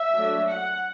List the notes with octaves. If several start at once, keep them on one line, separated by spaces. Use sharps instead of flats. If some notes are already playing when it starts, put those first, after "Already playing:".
Already playing: E5
F#3 A3 D4
F#5